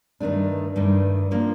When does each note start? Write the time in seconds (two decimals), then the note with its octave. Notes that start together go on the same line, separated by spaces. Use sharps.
0.20 G2 D#3 A3 D4
0.76 G2 D#3 A3 D4
1.31 F3 A#3 D4